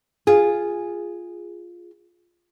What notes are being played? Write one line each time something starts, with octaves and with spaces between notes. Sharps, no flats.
F4 G#4